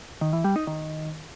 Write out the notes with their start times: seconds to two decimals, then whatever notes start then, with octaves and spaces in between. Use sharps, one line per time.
0.21 D#3
0.33 E3
0.44 G3
0.56 D#4
0.67 D#3